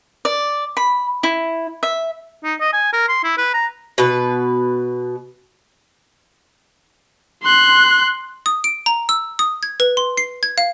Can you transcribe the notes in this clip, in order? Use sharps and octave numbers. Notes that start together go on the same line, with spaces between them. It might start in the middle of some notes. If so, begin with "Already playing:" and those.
D5
B5
E4
E5
D#4
D#5
G#5
A#4
C6
E4
B4
A#5
B2 B4
C6 F#6
D#6
D7
A#5
E6
D#6
G#6
B4
C6
C7
G#6
F5